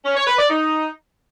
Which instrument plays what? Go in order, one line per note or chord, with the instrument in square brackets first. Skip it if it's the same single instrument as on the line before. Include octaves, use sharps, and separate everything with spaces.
[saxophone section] C#4
C#5
B4
D5
D#4